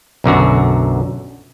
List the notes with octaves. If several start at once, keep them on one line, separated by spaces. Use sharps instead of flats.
B1 F#2 D3 F#4